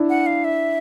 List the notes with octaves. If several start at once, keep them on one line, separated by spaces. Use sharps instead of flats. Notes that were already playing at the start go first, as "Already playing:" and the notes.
Already playing: D4 E4
F#5
F5
E5